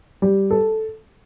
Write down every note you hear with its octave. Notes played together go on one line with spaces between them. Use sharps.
G3
A4